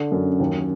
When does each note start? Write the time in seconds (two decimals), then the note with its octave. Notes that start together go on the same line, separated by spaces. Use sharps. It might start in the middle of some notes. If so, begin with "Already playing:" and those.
Already playing: D3
0.12 F#2
0.40 D#2